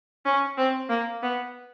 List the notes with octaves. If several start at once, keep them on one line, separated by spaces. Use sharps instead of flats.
C#4
C4
A#3
B3